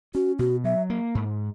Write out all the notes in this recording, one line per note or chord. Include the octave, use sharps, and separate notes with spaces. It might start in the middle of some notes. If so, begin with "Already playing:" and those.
C#4 F#4
B2 F#4
F#3 E5
A#3
G#2